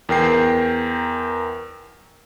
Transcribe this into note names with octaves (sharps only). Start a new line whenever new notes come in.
E2 A#4 G5 C7